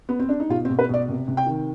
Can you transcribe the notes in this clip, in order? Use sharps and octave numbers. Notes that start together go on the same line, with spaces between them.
B3
C4
D4
D#4
B2 F4
C4
B2
B4
B2 D5
C3
C3
G5
D#3